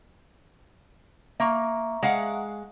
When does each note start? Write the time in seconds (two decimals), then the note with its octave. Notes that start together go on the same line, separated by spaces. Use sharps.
1.40 A#3 E5 A#5 C#6
2.03 G#3 F5 F#5